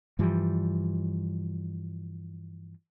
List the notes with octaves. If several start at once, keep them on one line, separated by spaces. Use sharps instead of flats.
G2 E3 F3 G3